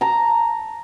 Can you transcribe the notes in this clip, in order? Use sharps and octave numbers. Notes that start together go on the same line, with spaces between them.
A5 A#5